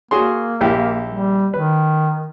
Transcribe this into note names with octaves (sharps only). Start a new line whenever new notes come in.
A#3 F#4 G#4 C6
A#1 E4 G4
G3
D#3 B4